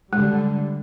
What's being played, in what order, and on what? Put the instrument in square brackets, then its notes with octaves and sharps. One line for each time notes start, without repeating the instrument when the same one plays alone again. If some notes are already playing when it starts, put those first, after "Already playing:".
[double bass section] D3 G3 [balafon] G#3